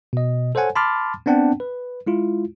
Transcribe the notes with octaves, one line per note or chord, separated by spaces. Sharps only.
B2 D#5
A4 C5 C#5 F#5 G#5
A5 B5 C6 D6 F6 A6
B3 C4 D4 F#5 G5 A5
B4
G#3 E4 F4